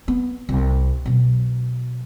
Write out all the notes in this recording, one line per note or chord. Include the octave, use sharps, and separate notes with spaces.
B3
C2
B2 F#3